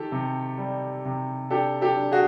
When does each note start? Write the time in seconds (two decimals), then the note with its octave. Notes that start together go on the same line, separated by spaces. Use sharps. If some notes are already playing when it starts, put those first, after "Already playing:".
Already playing: D#3 G4 A4
0.12 C3
0.58 G3
1.05 C3
1.51 D4 G4 A4
1.82 G4 A4
1.97 D4
2.12 F#4 G#4